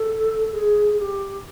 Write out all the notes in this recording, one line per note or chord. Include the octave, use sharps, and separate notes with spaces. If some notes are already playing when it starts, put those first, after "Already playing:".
Already playing: A4
G#4
G#4
G4